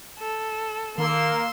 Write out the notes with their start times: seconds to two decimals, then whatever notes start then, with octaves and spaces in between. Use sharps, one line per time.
0.19 A4
0.98 D#3 A#3 C6 E6